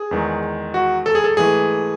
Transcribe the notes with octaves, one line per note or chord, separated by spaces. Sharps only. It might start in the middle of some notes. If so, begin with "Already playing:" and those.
Already playing: G#4
E2 D#3 G#3
F#4
A4
G#4
A4
G#2 E3 A3 G#4